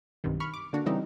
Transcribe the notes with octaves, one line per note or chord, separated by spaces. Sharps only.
B1 G2 C3 D#3
B5 C#6 F6
D6
D3 A#3 D4 F#4
C#3 E3 G3 C4 D#4 A4